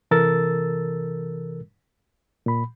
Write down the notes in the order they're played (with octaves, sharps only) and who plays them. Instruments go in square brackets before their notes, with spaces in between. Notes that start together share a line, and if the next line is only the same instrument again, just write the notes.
[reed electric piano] C3 E3 A4 A#4 E6 A6
A#2 B5